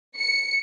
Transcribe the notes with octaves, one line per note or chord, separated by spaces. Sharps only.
C#7